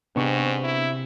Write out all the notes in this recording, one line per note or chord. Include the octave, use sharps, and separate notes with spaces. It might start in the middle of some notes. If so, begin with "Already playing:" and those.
G#2 C3 B3 D4 C#6
E4